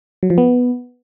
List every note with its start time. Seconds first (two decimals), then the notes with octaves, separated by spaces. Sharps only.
0.23 F#3
0.30 F3
0.38 B3